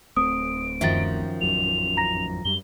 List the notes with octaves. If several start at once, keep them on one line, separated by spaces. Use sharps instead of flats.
D1 A3 C4 D#6 D7
F#2 D#3 F3 E5 A6
A1 F2 F#3 F7
A#5 A#6
F#2 G3 G7